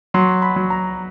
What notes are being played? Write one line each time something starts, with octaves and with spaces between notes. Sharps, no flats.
F#3 C6
B5
F#3
A#5